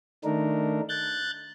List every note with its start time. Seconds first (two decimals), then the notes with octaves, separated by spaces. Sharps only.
0.24 D#3 A3 D4 D#4 A#4
0.89 F#6 G6 A6